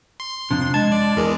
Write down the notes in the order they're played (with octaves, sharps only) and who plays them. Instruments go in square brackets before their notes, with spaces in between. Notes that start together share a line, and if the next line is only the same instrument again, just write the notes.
[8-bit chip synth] C6
[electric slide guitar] F2 C3 [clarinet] D4
[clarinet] G#3 [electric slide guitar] A5 [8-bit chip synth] G#6
[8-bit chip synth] D5
[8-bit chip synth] E2 G#3 [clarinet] A#4